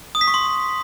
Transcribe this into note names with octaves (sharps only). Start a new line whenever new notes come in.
D#6
B6
C#6
C6